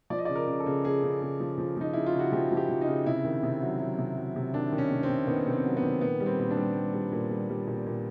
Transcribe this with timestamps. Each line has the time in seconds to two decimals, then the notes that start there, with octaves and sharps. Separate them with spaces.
0.10 F3 D5
0.18 D#5
0.25 C#3 D5
0.35 A#4
0.47 C#3
0.60 A4
0.66 C#3
0.84 C#3 G#4
1.03 C#3
1.21 C#3
1.40 F3
1.58 F3
1.77 F3 D#4
1.93 C#3 E4
2.06 F4
2.14 C#3
2.19 F#4
2.32 F3 G4
2.51 F3
2.57 G4
2.69 F3
2.81 D#4
2.87 C#3
3.06 C3 E4
3.24 D#3
3.43 C3
3.62 F#3
3.80 F#3
3.98 C3
4.17 F#3
4.36 C3
4.54 D#3 D4
4.72 D#3
4.78 C#4
4.91 C3
5.03 C4
5.09 C3
5.27 D#3 B3
5.46 C3
5.52 C4
5.65 F#3
5.77 B3
5.83 D#3
6.01 A#2 B3
6.20 G3
6.26 C4
6.39 A#2
6.51 D4
6.57 G3
6.75 G3
6.94 G3
7.12 A#2
7.31 G3
7.49 G3
7.67 A#2
7.86 A#2